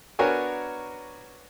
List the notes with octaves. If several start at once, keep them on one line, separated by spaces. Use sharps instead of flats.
B3 D4 F#4 A#4 C#5 G#5